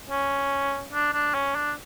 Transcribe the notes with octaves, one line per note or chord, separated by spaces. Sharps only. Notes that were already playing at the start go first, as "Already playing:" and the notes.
C#4
D4
D4
C#4
D4